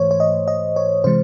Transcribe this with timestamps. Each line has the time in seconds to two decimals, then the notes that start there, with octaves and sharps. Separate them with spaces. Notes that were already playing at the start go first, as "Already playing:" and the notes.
Already playing: G#2 E3 A3 C5 C#5
0.11 C#5
0.20 D#5
0.48 D#5
0.76 C#5
1.04 C3 E3 G#3 C5